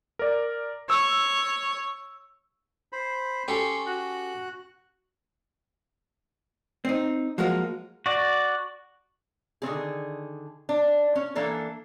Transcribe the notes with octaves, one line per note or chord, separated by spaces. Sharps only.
A#4 D5
C#5 E6
C5 B5
C#4 G4 A4 C6 C#6
F#4 F#6
C4 D#4
F3 F#3 G#3 A#3 F4 F#4
F#4 D5
D3 D#3 C4 G#4
D4
C#4
E3 A#3 D4 A4